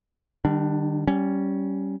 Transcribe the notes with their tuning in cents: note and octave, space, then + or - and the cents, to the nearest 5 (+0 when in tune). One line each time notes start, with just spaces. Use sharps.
D#3 -40 G3 +0 D4 +5
G3 -15 C#4 +0